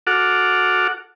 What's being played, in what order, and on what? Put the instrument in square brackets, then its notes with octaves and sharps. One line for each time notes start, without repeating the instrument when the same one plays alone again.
[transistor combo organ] F#4 A4 F#5 D6 F6